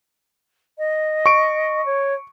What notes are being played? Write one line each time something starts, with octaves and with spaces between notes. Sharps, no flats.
D#5
C#6 D7
C#5